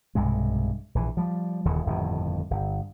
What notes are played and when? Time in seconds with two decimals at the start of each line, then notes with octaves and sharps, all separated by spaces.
0.15 B1 G2 C3 G#3
0.95 A#1 E3
1.17 F3 G3
1.65 D#1 D#2 C#3 E3
1.86 G1 F2 A2 D#3
2.51 G1